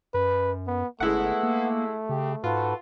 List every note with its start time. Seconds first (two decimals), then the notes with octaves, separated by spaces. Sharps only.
0.14 F#2 B4
0.67 B3
1.00 G1 G#3 A3 B3 E4 F#5
1.43 A#3
2.09 C#3 G4
2.44 G#2 F4 F#4 A4 B4